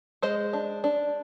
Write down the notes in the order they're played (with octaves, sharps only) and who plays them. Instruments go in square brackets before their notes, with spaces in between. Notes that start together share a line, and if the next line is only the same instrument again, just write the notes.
[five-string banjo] G#3 C5 D#5
D4
D4